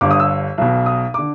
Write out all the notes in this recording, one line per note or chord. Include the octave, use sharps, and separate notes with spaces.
G1 G2 D3 D6
D#6
E6
B1 B2
D#6
D3 D6